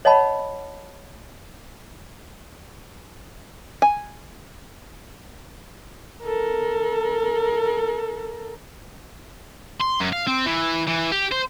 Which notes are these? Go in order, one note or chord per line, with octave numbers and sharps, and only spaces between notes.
C#5 D#5 F#5 A5 B5
G#5
A4 A#4
C6
F#2
F5
C4
E3
E3
G4
C5